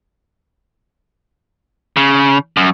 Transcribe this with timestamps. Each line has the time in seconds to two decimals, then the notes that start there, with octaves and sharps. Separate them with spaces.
1.97 C#3
2.57 F#2